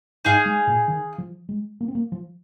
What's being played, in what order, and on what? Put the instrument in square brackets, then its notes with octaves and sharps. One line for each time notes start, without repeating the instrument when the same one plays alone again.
[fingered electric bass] G#2 [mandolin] D#4 G#4 F5
[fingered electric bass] G#3
A#2
D#3
F3
G#3
A#3
C4
A#3
F3